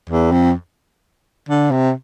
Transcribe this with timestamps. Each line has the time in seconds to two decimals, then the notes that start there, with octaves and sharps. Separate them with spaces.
0.09 E2
0.31 F2
1.48 D3
1.71 C3